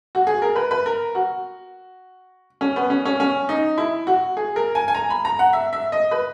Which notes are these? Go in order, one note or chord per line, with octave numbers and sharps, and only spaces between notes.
F#4
G#4
A#4
B4
B4
A#4
F#4
C#4
B3
C#4
C#4
C#4
D#4
E4
F#4
G#4
A#4
G#5
G#5
A#5
B5
A#5
F#5
E5
E5
D#5
B4